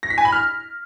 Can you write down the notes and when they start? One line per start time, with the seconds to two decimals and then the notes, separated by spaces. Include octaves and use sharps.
0.03 A#6
0.10 B6
0.18 G#5
0.25 B5
0.32 F6